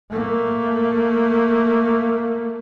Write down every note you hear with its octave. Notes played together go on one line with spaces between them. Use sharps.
A3 A#3